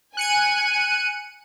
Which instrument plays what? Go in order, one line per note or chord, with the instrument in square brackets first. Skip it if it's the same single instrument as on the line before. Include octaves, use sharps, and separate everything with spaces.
[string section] G#5 [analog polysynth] F#6 C#7 D#7